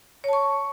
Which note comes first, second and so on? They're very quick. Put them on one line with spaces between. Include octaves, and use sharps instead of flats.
C#5 A5 C#6